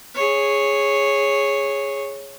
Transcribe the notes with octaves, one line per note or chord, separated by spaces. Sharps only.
G#4 C#5